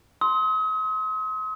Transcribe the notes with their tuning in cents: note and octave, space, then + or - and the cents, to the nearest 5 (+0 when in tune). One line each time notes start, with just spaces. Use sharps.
C6 +0 D#6 +40